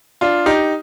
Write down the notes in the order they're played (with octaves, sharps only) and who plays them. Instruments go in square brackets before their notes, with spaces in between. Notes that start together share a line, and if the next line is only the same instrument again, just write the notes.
[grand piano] D4 F4
D#4 G4